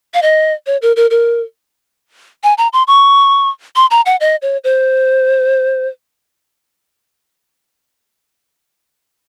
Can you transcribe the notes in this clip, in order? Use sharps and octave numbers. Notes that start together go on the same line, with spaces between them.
F5
D#5
C#5
A#4
A#4
A#4
G#5
A#5
C6
C#6
C6
A#5
F#5
D#5
C#5
C5